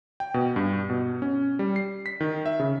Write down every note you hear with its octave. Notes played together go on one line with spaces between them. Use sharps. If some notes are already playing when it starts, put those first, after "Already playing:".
G5
B2
G2
B2
C#4
G3
C7
B6
D#3
E5
C#3